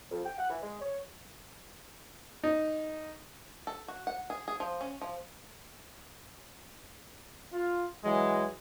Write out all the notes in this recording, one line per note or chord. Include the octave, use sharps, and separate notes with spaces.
F2
G5
F#5
E3
G#3
C#5
D#4
A4
F#4
F#5
G#4
G#4
F3
C#4
F3
F4
E3 F#3 G#3